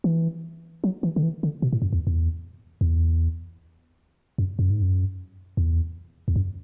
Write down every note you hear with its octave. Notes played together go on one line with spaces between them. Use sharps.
E3
F#3
E3
D3
E3
D3
B2
A2
F#2
E2
E2
E2
F#2
F#2
G#2
F#2
E2
E2
F#2